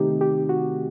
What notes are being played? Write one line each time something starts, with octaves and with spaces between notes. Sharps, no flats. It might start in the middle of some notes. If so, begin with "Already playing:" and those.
Already playing: C3 D#3 A3 C4 D#4 G4
G4
F#4